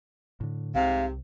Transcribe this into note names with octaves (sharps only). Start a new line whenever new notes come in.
A2 D3
C2 G#2 C3 F5